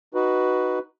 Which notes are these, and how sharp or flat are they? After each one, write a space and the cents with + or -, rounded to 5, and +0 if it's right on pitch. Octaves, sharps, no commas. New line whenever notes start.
D#4 +0 F#4 +10 B4 +0